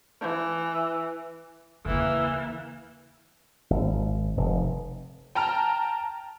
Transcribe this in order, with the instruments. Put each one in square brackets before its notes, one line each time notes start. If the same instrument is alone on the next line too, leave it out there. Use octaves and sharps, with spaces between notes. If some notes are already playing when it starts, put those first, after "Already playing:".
[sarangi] E3
[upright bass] E2 C#3 [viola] E3 A#3
[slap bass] G#1
F1
[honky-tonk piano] G5 A5 A#5 F6